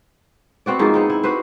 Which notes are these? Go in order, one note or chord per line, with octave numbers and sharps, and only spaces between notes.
B3 C4 F#4 D5
G#2 F3 A#3 G#4
B3 C4 D#4
E4
F#4 G4 B4 C5